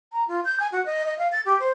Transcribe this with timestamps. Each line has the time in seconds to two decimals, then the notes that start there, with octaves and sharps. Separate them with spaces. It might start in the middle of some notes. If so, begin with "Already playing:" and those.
0.13 A#5
0.28 F4
0.45 G6
0.60 G#5
0.72 F#4
0.86 D#5
1.06 D#5
1.18 F5
1.32 A6
1.45 G4
1.60 C5